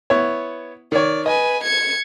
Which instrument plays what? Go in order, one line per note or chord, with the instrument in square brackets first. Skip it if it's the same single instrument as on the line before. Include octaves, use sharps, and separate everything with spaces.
[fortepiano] B3 E4 C#5
[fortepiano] D#3 C#5 [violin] D5
[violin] B4 G#5 [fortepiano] D#5
[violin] G#6 C#7